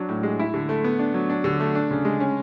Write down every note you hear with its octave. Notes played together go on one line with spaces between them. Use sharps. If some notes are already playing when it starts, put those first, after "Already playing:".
Already playing: F#3 D4
A2
G#3
E4
D3
A3
B3
D4
F#3
D4
D3
A3
D4
C#3
G#3
C#4